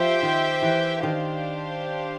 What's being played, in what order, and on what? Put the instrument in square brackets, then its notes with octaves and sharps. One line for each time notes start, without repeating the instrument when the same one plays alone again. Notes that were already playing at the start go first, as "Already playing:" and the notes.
Already playing: [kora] F3 [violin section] G4 C5 E5 G5
[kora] D#3
E3
[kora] D#3 [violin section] D4 G4 C5 F5